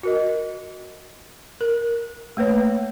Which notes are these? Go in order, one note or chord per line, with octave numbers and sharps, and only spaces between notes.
F#4 A#4 D#5
A#4
A3 A#3 B4 C#5